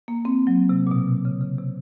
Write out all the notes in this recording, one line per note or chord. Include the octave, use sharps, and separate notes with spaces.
A#3
C4
F#3
C3
A#2
B2
C3
C#3
C#3
C3